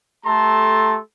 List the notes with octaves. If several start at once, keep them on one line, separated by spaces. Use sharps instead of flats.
A3 G4 A4 A5 A#5 C6